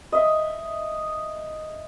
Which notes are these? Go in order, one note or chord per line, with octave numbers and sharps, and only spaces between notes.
D#5 E5